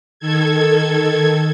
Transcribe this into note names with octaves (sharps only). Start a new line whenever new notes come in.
D#3 A4 G#6